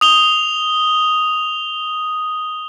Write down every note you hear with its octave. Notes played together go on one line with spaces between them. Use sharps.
D#6 F7 G7